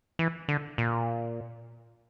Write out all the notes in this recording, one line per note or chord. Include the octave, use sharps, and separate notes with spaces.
E3
D3
A#2